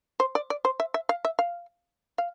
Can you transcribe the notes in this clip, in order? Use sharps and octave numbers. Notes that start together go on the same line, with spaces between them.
C5
D5
D5
C5
E5
E5
F5
E5
F5
F5